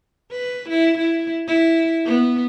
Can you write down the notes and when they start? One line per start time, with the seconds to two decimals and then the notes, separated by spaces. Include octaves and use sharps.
0.31 B4
0.69 E4
0.98 E4
1.48 E4
2.05 B3